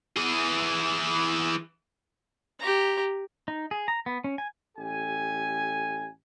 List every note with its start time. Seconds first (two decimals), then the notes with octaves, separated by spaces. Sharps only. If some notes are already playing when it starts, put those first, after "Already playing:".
0.17 E3 G#4
2.60 G4 A#5
3.48 D#4
3.71 G#4
3.88 A#5
4.06 B3
4.24 C#4
4.38 G#5
4.77 A1 G4 A4 G#5